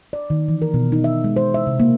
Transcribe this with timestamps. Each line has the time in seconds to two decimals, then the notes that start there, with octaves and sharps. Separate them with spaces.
0.13 D5
0.30 D#3
0.48 E3
0.62 A#4
0.74 B2
0.92 D#4
1.04 E5
1.24 G#3
1.36 C5
1.54 E5
1.67 C3
1.80 A#3